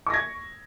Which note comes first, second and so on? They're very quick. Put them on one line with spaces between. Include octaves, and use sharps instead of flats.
C#6 A#6 G#6